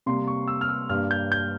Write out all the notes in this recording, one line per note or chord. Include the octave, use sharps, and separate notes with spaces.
C3 G3 A#3 C6
C#6
E6
F6
E6
G2 G3 A#3 F6
G6
G6